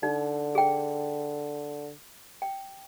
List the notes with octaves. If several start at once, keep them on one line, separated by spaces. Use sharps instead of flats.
D3 D#4
G#4 G5
G5